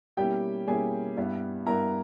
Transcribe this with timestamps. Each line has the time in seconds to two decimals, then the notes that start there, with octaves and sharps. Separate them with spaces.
0.17 B2 G3 A#3 C#4 E4 G4 G5
0.67 B2 G3 A#3 C#4 E4 G#4 G#5
1.17 G2 G3 B3 E4
1.66 G2 G3 B3 E4 A#4 A#5